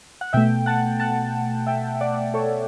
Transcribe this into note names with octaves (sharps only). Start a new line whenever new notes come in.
F#5
B2 A3 E5 G5
F#5 A5
F#5 A5
E5 G5
D5 F#5
A4 C#5